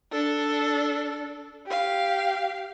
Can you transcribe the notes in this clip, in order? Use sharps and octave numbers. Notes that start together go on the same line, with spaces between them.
D4 A4
G4 F5